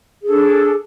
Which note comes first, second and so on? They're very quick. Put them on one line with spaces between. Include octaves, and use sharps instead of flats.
G#4 A4 D4